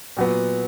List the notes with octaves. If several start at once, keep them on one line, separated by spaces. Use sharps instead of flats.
A#2 F#3 B3